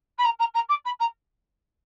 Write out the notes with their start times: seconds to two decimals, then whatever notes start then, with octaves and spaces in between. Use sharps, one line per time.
0.18 B5
0.24 A#5
0.39 A#5
0.54 A#5
0.69 D6
0.85 B5
0.99 A#5